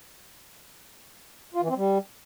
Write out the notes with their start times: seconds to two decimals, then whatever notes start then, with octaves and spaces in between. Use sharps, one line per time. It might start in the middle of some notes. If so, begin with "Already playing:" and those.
1.54 F4
1.62 E3
1.69 C4
1.76 G3